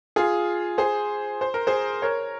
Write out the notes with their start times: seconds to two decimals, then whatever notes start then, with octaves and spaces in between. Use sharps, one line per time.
0.16 F4 G#4
0.78 G#4 C5
1.41 C5
1.54 A#4
1.67 G#4 C5
2.02 A#4 C#5